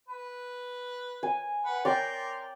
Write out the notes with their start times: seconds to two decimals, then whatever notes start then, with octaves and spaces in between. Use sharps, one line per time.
0.08 B4
1.23 G#5
1.66 B4 F#5
1.85 A#4 D5 G5 C6